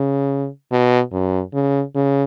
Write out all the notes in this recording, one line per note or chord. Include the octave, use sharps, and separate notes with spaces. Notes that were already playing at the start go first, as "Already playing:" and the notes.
Already playing: C#3
B2
F#2
C#3
C#3